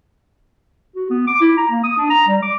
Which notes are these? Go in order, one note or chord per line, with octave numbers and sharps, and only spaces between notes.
F#4
B3
D6
E4
A#5
A#3
D#6
D4
A#5
G3
D6